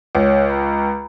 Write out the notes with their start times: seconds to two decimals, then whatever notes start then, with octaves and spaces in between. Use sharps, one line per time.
0.15 C#2 C#5
0.49 A#5 B5